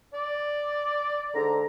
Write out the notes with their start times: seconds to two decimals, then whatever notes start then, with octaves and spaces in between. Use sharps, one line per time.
0.14 D5
1.35 G#2 D3 A#5